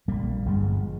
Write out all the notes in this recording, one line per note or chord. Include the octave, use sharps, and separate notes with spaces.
A#1 A#2 G3 A#3
G1 G2 F3 G#3